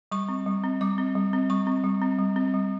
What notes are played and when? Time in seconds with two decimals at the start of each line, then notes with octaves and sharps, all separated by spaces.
0.12 G3 C#6
0.28 C4
0.46 G3
0.64 C4
0.81 G3 D6
0.98 C4
1.15 G3
1.33 C4
1.50 G3 C#6
1.67 C4
1.84 G3
2.02 C4
2.19 G3
2.36 C4
2.54 G3